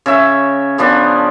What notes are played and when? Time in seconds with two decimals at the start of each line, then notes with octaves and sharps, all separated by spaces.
0.06 C#3 C#5 E5
0.78 C#3 F3 B3 D4